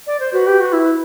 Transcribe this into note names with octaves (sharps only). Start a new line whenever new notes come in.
D5
C5
F#4 B4
G4
F#4
E4